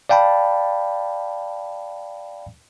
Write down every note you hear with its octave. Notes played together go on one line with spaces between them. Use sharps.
D5 F5 G5 A5 B5